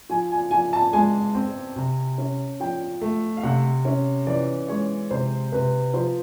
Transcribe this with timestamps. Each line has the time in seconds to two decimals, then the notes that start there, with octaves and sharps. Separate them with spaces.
0.10 F3 G#5
0.31 G#5
0.51 F3 G#5
0.73 A5
0.93 G#3 G#5
1.35 C4
1.76 C3
2.18 C#4
2.60 F3 G5
3.01 A3
3.37 F5
3.43 C3 F#5
3.85 C#4
4.27 E3 D5
4.68 G#3 C#5
5.11 C3 C5
5.52 C3 B4
5.94 F3 C5